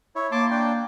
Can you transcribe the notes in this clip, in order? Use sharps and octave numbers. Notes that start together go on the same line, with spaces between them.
E4 C#5
A#3 A5 C6 D6
D4 G5